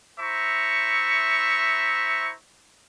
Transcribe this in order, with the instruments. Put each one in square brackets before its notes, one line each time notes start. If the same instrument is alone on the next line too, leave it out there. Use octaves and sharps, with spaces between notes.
[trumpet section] E4 C5 E5 A#5 C#6